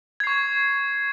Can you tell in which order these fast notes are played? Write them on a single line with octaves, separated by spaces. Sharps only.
G#6 C7 C#6